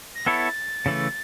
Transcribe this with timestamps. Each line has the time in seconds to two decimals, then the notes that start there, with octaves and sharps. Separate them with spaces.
0.15 A#6
0.26 B3 E4 A4 C#5 A6
0.86 C#3 E3 A3